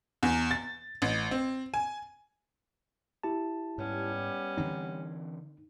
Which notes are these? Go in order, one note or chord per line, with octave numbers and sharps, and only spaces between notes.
E2
A6
A1
C4
G#5
E4 G4 A5
G#2 G3 B3 C#4
D3 E3 C4 D#4